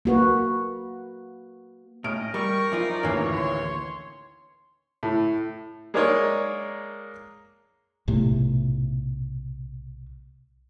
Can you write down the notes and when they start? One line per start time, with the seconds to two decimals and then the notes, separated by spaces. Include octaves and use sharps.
0.05 A#3 F#4 B4
2.04 A2 C#4 D#4 D#5 F6 D7
2.34 G3 A#4 G5 C#6
2.72 F#2 F3 D#4 F4 D5
3.03 A1 D2 D#3 E3 A#3 C#5
3.33 C6
5.03 A2
5.94 G#3 A#3 D4 D#4 A#4 C#5
8.08 B1 A2 C3 A3